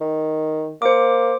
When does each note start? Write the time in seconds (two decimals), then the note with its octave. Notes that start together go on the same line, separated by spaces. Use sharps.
0.01 D#3
0.82 A#3 C5 D6